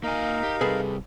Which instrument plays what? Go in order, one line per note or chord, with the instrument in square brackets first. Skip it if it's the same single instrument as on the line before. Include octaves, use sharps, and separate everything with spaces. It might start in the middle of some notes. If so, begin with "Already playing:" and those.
[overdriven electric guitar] A#3 G#5 [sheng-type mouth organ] D#4 A#4 F5
[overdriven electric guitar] G4
[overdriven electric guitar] C3 G3 [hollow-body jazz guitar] G#4 A4 B4